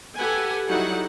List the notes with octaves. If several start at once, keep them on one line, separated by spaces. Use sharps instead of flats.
G4 A4 B4 F#5 G#5
F#3 G3 D#4 E4 A4 F#5